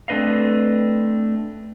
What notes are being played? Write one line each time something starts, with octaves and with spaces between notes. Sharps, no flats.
A3 C4 D4 B4 D#5 F5